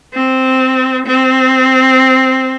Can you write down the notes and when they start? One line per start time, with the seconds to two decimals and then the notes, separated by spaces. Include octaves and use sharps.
0.14 C4
1.06 C4